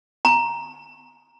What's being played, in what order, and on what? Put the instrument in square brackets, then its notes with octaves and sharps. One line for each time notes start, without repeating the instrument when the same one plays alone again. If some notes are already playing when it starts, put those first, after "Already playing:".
[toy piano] A#5